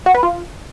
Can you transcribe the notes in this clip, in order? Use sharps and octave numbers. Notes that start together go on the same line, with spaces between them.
F#4
B4
F4